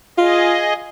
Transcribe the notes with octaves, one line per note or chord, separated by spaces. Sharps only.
F4 G#4 D#5